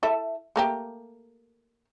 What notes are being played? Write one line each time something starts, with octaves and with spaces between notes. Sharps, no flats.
E4 A4 E5
A3 A#3 G4